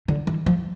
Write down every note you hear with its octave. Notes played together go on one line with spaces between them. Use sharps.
D3
E3
F3